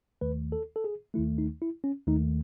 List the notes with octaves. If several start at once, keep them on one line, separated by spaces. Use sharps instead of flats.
D#2 D#3 A3 B4
A4
A4
G#4
D#2 D#3 A3 E4
D#4
E4
C#4
D#2 D#3 A3 D#4